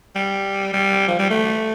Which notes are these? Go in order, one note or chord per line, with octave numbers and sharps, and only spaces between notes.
G3
G3
F3
G3
A3